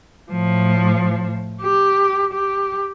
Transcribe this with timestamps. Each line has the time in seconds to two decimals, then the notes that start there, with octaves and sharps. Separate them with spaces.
0.31 A2 F3
1.62 G4
2.34 G4